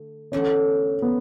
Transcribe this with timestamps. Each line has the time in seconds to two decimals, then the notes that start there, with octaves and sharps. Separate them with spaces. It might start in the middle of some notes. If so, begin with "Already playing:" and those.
Already playing: D3 A3
0.32 E2 D3 A3 C#4
1.02 B3